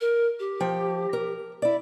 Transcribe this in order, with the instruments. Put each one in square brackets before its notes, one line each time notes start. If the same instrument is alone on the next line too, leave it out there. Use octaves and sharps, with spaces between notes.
[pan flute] A#4
G4
[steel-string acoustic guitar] F3 G5
A#4
E4 D5